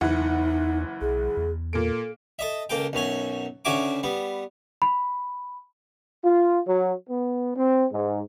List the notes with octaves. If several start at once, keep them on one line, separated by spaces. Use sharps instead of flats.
F#1 E2 E3 D#4 F#5
B1 G#4
E2
A#2 A#3 A4 D7
A4 D#5 E5
C#2 A#3 A4 G5
B1 F#2 F#3 G#5
D2 C#3 F#4 E5 G#5 D6
G3 B3
B5
F4
F#3
B3
C4
G#2